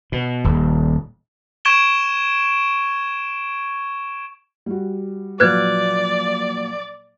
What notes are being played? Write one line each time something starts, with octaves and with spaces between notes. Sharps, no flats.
B2
D#1
C#6 G#6 D7 E7 G7
G3 F#4
A#2 F3 F#3 B4 D5 F#6 G#6